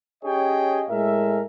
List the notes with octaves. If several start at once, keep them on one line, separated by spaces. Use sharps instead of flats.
C#4 G4 G#4 C#5 D#5 G5
A2 G#3 A#4 E5